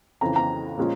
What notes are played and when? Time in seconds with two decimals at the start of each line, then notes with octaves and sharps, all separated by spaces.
0.21 F2 C#3 E3 A#5
0.36 A#5
0.77 A#2 F3 G#3 C#4